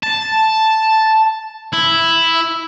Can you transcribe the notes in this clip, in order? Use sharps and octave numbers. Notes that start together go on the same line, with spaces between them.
A5
E4